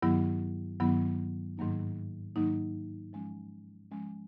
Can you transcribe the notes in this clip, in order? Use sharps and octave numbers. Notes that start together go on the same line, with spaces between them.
G2 D#3 F#3 B3 E4
G2 D#3 F#3 B3 E4
G#2 D#3 F#3 A#3 D#4
G#2 D#3 F#3 A#3 D#4
F3 G#3 C#4
F3 G#3 C#4